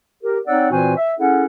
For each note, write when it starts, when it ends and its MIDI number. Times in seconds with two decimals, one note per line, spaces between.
0.22 0.38 67
0.22 0.38 70
0.46 0.68 60
0.46 0.68 63
0.46 0.68 73
0.46 0.68 74
0.46 0.68 78
0.46 0.68 88
0.71 0.96 46
0.71 0.96 52
0.71 0.96 60
0.71 0.96 66
0.71 0.96 72
0.71 0.96 80
0.96 1.12 76
1.19 1.45 61
1.19 1.45 64
1.19 1.45 68
1.19 1.45 69
1.19 1.45 78